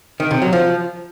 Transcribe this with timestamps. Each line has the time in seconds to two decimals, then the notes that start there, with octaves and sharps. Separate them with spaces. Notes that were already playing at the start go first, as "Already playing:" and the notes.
0.20 D#3
0.31 C3
0.42 F#3
0.53 F3